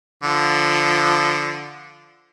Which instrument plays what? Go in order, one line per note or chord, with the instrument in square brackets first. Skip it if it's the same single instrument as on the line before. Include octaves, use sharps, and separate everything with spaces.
[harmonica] D3 F3